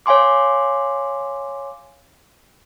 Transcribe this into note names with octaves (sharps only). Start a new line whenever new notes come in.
C#5 F5 G#5 C6 D6